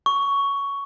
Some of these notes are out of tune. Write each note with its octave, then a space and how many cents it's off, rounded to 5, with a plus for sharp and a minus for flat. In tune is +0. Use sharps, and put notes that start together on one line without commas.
C#6 +10